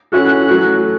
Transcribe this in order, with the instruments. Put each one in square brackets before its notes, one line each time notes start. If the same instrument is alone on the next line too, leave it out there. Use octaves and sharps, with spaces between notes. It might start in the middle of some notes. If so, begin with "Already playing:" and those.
[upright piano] E3 C#4 F#4 A4 [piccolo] F#6
[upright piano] F#3 A3 F#4